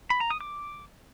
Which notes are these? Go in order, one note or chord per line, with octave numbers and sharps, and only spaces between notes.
B5
A#5
D#6
D6